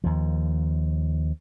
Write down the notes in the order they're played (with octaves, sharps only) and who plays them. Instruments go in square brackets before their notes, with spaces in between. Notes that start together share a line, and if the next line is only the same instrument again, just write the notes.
[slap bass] D#2 F3